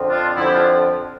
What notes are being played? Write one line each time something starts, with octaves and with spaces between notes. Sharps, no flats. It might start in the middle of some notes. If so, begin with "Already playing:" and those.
Already playing: F2 D3 F3 C4
D4 F4
F2 D3 F3 C4 E4
G4
D4 F4